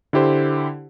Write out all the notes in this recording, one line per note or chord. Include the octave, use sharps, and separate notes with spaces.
D3 E4 G4 C5